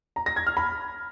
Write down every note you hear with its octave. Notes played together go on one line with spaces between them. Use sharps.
A#5
A#6
G#6
F6
B5